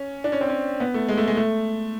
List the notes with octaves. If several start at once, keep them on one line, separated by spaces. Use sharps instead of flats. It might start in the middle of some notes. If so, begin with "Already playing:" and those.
Already playing: C#4
D4
C#4
C4
C#4
B3
A3
G#3
A3
G#3
A3